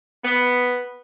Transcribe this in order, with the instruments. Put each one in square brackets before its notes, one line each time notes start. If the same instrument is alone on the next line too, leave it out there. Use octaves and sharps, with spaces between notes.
[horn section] B3